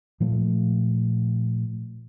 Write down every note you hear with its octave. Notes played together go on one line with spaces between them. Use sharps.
A#2 F3 A3